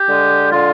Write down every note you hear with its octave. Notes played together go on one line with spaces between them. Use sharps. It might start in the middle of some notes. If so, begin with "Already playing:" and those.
Already playing: G4
D3 G#3
D3 G#3 F4